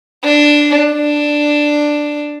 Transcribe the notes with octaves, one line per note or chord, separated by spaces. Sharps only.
D4
D4